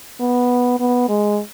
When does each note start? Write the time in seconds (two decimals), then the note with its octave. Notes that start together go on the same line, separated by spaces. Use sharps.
0.20 B3
0.79 B3
1.08 G#3